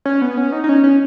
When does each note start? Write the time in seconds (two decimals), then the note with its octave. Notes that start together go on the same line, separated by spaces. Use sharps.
0.05 C#4
0.22 B3
0.37 C#4
0.52 D#4
0.64 D#4
0.69 C#4
0.84 C#4